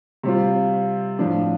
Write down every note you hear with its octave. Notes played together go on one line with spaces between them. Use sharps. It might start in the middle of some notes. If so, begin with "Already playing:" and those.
C3 G3 C4 F4
A2 F3 D4